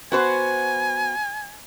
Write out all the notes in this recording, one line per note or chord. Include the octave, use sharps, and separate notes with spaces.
B3 F#4 C5 G#5